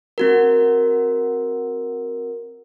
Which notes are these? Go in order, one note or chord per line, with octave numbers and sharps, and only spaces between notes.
C4 F#4 A#4